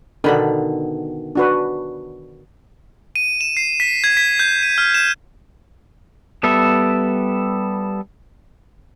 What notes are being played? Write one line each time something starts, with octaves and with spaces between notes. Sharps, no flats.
B2 D3 D#3 D4 B5
D4 F#4 B4
D#7
E7
C7
B6
G#6
B6
G6
D#7
F6
E7
G3 B3 A4 E5